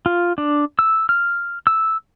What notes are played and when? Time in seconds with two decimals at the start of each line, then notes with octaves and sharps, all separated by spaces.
0.06 F4
0.38 D4
0.79 E6
1.09 F6
1.67 E6